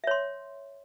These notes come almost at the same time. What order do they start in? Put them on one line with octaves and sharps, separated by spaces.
E5 C#5 C6